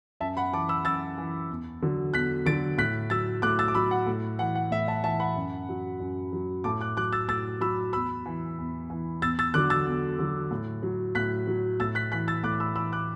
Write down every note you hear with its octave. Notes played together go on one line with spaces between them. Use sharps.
F#2 E5 A5
F#5 B5
E3 A5 D6
B5 E6
F#2 E6 A6
E3
E2
D3 F#3
E2 F#6 B6
D3 F#3 A6 D7
A2 F#6 B6
F#3 E6 A6
A2 D6 F#6
E6 A6
D6
F#3 B5 E6
F#5
A2
E3 F#5
F#5
A2 E5
E5 A5
E3 E5 A5
F#5 B5
F#2
F#3
F#2
F#3
A2 A5 D6
D6 F#6
F#3 D6 F#6
E6 A6
A2 E6 A6
F#3 B5 E6
E2 B5 E6
E3
E2
E3
E2 E6 A6
E6 A6
D3 F#3 D6 F#6
E6 A6
E2
D3 F#3
A2
F#3
A2 F#6 B6
F#3
A2 E6 A6
F#6 B6
E3 F#6 B6
E6 A6
A2 D6 F#6
B5 E6
E3 B5 E6
D6 F#6